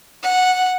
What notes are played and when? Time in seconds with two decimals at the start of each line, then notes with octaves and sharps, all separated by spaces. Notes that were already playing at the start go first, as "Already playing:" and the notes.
0.23 F#5